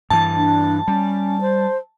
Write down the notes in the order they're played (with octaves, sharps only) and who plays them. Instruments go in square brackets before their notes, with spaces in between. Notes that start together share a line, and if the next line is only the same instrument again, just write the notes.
[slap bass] G2 E3 [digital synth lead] A5
[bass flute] D4
[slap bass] G3 [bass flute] C#4
[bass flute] C5